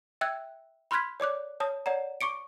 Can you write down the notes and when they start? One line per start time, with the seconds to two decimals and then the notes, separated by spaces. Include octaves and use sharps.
0.21 E5 G5 E6 F#6 G#6
0.91 B5 C6 F6 F#6 G#6 B6
1.20 C#5 D5 D6 F#6
1.60 C#5 A5 D#6
1.86 C#5 D5 F#5 A#5
2.21 C#6 D6 C#7 D7